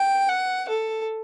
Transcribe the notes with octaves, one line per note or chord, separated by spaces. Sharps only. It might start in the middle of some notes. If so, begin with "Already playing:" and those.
Already playing: G5
F#5
A4